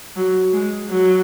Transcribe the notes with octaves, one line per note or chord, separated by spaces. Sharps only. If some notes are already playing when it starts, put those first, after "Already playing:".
F#3
G#3
F#3